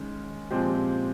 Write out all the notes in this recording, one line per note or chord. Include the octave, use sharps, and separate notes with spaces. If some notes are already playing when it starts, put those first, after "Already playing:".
Already playing: D#3 G#3 C#4
A#2 F3 G#3 C4 G4